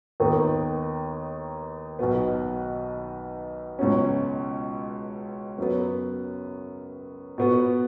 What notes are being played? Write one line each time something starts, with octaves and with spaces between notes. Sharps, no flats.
D#2 D#3 B3 D#4
B1 B2 B3
C#2 B2 F#3 C#4
F#2 F#3 B3
B2 B3 F#4